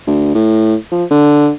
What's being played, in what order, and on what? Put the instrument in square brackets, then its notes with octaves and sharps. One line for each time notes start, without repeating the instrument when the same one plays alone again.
[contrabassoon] D2
A2
F3
D3